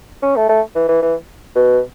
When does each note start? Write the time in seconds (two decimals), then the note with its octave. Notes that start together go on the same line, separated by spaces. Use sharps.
0.23 C#4
0.37 A3
0.49 A3
0.75 E3
0.89 E3
1.02 E3
1.55 B2